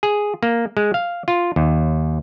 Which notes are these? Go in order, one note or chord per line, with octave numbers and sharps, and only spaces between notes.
G#4
A#3
G#3
F5
F4
D#2